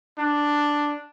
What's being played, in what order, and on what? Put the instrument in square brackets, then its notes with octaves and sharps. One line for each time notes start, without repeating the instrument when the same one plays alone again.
[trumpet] D4